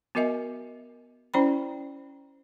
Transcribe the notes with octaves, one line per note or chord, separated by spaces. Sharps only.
B3 F#4 A#4 D#5 E5 G#5
C#4 E4 C5 D5 G5 B5